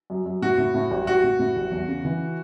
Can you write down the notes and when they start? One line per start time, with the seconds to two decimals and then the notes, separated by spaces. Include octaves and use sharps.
0.10 F#2
0.26 F#2
0.42 A2 F#4
0.58 A2
0.74 A2
0.91 A1
1.07 A1 F#4
1.23 A2
1.39 A2
1.56 A1
1.72 E2
1.88 C#3
2.05 E3